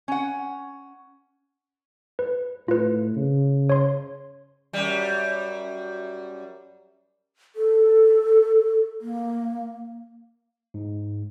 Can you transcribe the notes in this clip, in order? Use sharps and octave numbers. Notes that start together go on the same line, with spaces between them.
C#4 F#5
B4
A2 F4 B4
C#3
C#5 C6
F#2 G3
A4
A#3
G#2